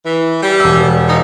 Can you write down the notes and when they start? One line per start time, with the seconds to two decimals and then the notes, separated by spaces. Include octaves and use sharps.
0.04 E3
0.42 G3
0.60 E1 E6
1.07 F3 G3 D#4